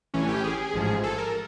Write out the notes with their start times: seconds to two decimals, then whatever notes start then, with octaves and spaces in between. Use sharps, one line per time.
0.14 A1 A2 E3 C#4
0.29 G4
0.44 G#4
0.74 A1 G#2 F3
1.03 A4
1.18 A#4